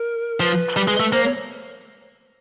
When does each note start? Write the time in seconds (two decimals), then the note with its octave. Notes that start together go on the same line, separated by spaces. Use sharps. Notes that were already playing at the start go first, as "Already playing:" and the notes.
Already playing: A#4
0.40 F3 B4
0.76 G3
0.88 G#3
1.00 A3
1.12 A#3 C5
1.23 C#5